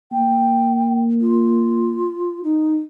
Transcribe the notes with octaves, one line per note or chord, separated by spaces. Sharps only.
A#3 G5
F4
D#4